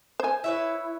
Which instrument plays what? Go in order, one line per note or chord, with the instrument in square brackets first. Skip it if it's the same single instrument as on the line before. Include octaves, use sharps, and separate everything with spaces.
[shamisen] C5 G#5
[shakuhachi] E4 [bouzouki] B4 C#5 E5